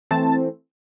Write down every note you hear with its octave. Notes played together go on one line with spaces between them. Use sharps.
E3 A3 C4 A5